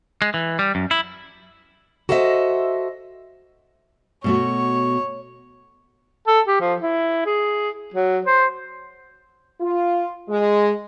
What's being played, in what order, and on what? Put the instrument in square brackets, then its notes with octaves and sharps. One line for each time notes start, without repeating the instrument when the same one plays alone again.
[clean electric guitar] G#3
E3
G3
F#2
E4
[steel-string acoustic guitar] F#4 A4 C5 D#5 E5
[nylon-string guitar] B2 A3 F#4 [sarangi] C#5
[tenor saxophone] A4
G4
F3
E4
G#4
F#3
C5
[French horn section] F4
G#3